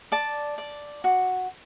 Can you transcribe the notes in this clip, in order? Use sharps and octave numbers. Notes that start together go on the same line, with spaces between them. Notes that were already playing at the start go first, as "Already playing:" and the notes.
D5 A5
D5
F#4